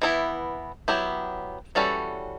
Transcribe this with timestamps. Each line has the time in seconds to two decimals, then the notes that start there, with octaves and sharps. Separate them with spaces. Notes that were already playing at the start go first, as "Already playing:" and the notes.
0.02 E3 B3 E4
0.88 F#3 B3 E4 G4
1.75 E3 G3 C#4 F#4 A4